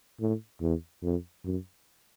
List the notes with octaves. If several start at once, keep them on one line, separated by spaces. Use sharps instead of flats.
A2
E2
F2
F#2